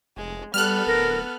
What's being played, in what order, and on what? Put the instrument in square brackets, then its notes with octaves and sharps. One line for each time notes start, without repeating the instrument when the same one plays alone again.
[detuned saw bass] F1 [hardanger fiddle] G#3
[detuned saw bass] G3 [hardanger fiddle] B3 A4 [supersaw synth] F6 F#6
[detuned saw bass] D1 [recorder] A#4